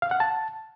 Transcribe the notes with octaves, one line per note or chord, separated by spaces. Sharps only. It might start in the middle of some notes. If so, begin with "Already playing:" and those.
F5
F#5
A5